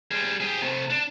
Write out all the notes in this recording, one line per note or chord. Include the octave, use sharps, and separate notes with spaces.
G3 G#4
G4 G#4
C3 A3
D4